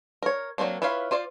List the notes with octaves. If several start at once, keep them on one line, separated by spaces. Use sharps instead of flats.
A#4 C#5
F#3 G#3 A#3 C4 D4
E4 F4 B4 C#5 F5
F4 C5 D5 F5